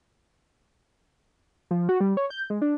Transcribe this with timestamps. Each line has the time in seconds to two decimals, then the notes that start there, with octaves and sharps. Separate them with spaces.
1.71 F3
1.89 F#4
2.00 G3
2.17 C#5
2.30 G6
2.50 G#3
2.62 D4